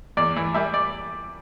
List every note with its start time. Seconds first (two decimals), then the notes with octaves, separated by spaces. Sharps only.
0.17 E2 D5
0.36 E3
0.54 G3 E5
0.74 D5